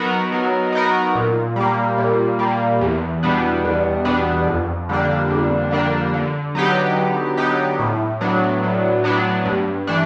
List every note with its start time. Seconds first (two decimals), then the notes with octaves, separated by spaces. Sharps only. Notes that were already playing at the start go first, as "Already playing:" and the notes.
Already playing: F#3 B3 D#4 F#4 A#4
0.32 F#3
0.72 B3 D#4 F#4 A#4
1.15 A#2
1.56 G3 A#3
1.98 A#2
2.39 G3 A#3
2.81 E2
3.23 B2 G3 B3 D4
3.65 E2
4.05 B2 G3 B3 D4
4.47 F2
4.89 D3 G3 A#3 D4
5.30 F2
5.71 D3 G3 A#3 D4
6.14 D3
6.55 F#3 B3 D#4 G4
6.96 D3
7.37 F#3 B3 D#4 G4
7.79 A2
8.21 F#3 B3 D4
8.63 A2
9.04 F#3 B3 D4
9.45 G2
9.87 E3 A3 D4